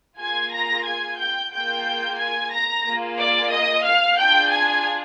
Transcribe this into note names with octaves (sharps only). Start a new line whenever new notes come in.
A#3 F4 G#4 G#5 G#6
A#5 A#6
G#5 G#6
G5 G6
A#3 F4 G#4 G5 G6
G#5 G#6
A#5 A#6
A#3 F4 G#4
D5 D6
D#5 D#6
F5 F6
D4 F4 G#4 G5 G6
G#5 G#6